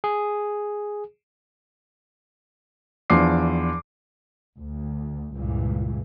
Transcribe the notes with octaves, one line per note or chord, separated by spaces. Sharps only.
G#4
E2 F3 D4 C6 D6 C7
D2
C#2 G2 A#2 E3